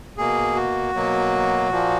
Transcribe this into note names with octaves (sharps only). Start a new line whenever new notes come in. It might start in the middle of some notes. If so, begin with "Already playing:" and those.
B2 A#3 G#4
F#4
B2 F#3 A#3
A#2 F3 A#3